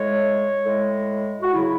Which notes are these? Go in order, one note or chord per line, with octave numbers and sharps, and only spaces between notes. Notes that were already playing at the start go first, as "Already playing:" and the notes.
Already playing: A2 G#3 C#5
A2 G#3
F#4
C#3 F#3 E4